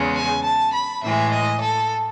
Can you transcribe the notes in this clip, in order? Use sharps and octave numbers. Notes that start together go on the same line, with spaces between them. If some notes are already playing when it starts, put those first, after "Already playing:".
Already playing: E2 C#3 G#3
G#5
A5
B5
A2 E3 G#3 E5
D#5
A4